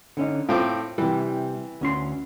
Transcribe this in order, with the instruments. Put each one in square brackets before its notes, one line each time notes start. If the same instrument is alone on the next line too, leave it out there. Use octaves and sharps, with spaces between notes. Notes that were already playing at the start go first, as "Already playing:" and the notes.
[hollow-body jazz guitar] D3 C#4 D#4
[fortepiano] A2 C4 D6 [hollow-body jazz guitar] F4
[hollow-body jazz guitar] C3 G3 [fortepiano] E3
[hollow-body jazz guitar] D2 C#4 C6